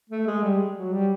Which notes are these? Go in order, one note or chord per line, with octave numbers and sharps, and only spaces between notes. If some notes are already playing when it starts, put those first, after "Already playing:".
A3
G#3
G3
F#3
G3